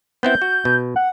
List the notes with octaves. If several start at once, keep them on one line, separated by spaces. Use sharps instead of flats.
B3 C4 E4 G6
F#4
B2
F#5